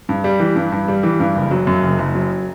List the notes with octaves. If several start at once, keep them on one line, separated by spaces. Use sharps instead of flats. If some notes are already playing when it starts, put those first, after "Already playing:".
G2
G3
E3
G2
G2
G3
E3
G2
F#1
F#3
F#2
F#1
F#1
F#3